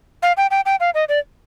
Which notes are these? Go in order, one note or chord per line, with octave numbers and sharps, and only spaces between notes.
F5
G5
G5
G5
F5
D#5
D5